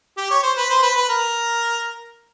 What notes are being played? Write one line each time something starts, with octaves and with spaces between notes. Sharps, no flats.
G4
C#5
C5
B4
C5
B4
B4
A#4